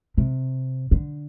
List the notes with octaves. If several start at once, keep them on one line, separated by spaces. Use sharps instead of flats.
C3
D3